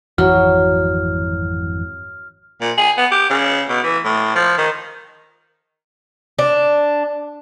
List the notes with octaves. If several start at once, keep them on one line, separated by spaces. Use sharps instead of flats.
G#1 F2 E3 F#3 F6
A#2
G#4
B3
G4
C#3
B2
E3
A2
F3
D#3
D4